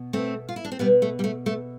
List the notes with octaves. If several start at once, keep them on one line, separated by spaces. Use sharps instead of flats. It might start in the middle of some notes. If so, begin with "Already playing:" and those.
Already playing: B2
A3 C4
F4
E4
D4
C4
B2 G3 B3
A3
G3
A3
A3